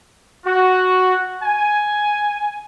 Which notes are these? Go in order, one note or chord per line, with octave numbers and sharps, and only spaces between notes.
F#4
G#5